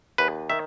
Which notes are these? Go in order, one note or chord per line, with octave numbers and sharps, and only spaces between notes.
D#2 B4
D#3 E5